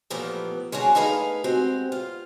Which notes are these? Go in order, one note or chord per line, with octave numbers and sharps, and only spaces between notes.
A#2 E3 F3 G3 A3 B3
G#3 C#4 D4 F#4 G#4
A3 D#4 E4 G#4 B4 F5
G#3 C4 F#4 G4
F4